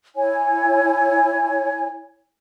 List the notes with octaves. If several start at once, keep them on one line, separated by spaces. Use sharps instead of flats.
E4 C#5 G#5